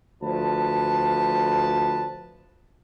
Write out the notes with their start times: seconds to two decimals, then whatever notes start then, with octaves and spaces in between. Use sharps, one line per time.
0.22 D2 F3 B4 A5